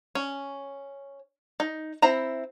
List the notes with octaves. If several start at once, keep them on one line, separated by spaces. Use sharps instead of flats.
C#4
D#4
C4 E4 A#5